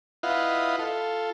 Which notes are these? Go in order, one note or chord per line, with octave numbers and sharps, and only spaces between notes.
E4 F4 B4 D#5 F5 F#5
F4 A4